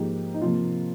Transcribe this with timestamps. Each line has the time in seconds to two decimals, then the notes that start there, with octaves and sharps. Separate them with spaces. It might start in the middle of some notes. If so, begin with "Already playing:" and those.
Already playing: G#2 F3 A#3 D#4 G4
0.34 D#4
0.42 C3 F3 A#3 F4